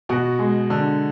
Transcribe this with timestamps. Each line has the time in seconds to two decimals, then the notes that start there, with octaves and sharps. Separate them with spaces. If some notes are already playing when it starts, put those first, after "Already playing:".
0.09 B2 F#4
0.39 G#3
0.70 D3